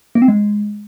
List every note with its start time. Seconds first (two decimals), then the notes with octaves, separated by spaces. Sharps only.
0.15 A#3
0.22 C4
0.28 G#3